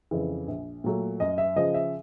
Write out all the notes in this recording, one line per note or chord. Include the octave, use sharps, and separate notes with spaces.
F2 C#3 E3
A#1
A#2 F#3 A3
F#2 D#5
E5
C#3 F3 D#5
E5